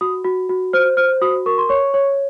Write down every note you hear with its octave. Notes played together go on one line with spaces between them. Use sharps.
F#4 D#6
F#4
F#4
C5 F6
C5 F6
F#4 D#6
A#4 C#6
C6
C#5 C#6
C#5